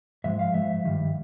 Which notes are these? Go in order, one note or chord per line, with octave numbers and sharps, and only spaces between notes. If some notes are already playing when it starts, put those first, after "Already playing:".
G#2 F3 G#3 E5
F5
G#2 F3 G#3 E5
G2 D#3 G3